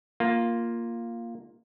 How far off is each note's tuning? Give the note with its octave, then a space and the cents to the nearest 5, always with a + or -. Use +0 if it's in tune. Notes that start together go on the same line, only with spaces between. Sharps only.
A#3 +0 F4 +0